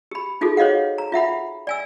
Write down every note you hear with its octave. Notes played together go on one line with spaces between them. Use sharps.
G4 B5
D#4 F4 F#4 G#4 A4
C5 C#5 D#5 F5 F#5
A#5
F4 E5 F#5 B5
D5 G#5 E6